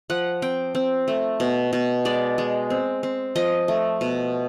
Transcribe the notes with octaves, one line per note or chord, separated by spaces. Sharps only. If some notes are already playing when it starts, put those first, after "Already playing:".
F3 F#5
C4 G5
C4
A3
B2
B2
G#3 D5
G#3
C4
C4
F3 D#5
A3
B2